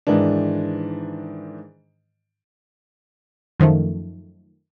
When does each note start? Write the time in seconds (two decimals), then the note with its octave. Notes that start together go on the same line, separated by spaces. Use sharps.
0.07 G#2 D#3 E3 D4
3.59 F#2 D#3 F3 A3